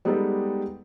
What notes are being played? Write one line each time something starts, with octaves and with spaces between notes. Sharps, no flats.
G3 G#3 B3 D#4 G4 A4